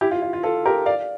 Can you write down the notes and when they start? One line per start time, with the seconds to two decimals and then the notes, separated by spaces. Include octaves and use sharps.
0.01 E4 G4
0.11 F4
0.22 F4
0.33 F4
0.43 F4 A4
0.66 G4 A#4
0.86 D5 F5